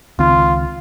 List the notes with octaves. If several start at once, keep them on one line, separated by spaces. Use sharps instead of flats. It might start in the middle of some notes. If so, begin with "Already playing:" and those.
C#2 D#3 C4 F4